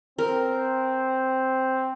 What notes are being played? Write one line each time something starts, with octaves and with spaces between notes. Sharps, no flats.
C4 A#4